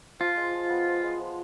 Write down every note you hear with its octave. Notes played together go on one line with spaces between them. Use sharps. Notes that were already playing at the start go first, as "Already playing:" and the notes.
F3 F4
G#3
F3
B3
F3
G#3
F3